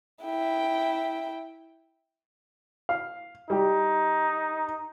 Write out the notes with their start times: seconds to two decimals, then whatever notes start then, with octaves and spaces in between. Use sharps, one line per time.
0.25 E4 G5
2.89 F5
3.50 G3 D#4 G4